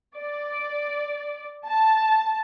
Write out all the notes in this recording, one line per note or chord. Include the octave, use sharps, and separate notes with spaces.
D5
A5